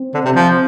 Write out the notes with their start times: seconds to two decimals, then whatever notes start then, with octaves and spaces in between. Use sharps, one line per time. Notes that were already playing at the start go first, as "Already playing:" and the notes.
Already playing: C4
0.14 D3
0.25 C3
0.36 F3